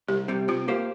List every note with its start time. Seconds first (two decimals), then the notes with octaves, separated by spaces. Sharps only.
0.08 C2 G4
0.28 C3 G3
0.48 C3 F4
0.68 A#3 G4 C5 F5